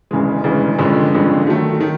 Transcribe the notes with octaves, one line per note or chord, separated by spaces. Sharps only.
E1 D2 C#3 E3 G#3
E1 D2 C#3 E3 G#3
A1 G2 D3 F3 G#3
A1 G2 D3 F3 G#3
D#3 F#3 A3
D#3